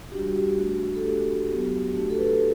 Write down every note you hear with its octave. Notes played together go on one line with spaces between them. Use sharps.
G3 D4 F#4 G4
F#4
G4
A3 D4 F#4
A4
A3 D4 F#4 G4
F#4
F#3 B3 F#4 G4
A3 D4 F#4 G4
A4
B4
A4